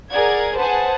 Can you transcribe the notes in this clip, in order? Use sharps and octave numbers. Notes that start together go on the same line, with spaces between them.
G#4 A#4 D5 F#5 G#6
G#4 B4 C5 F#5 G#5 A5